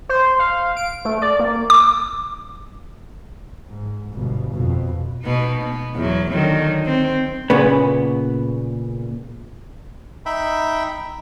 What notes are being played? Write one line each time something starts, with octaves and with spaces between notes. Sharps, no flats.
C5
F5
D7
A3
D5
A#3
D6
G#2
G1 B2
F2 B2
B2 B3 D#4
B3
E2 F#3
D3 D#3 F#3
C4
A#2 C#3 B3
D#4 E5 G5 B5